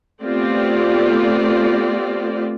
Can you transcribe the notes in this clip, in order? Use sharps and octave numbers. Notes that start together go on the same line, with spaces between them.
A3 B3 C4 F4 G4 D5